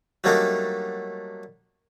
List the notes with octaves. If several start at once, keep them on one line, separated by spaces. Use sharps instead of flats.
F#3 G3 A3 A#3 D4 D#4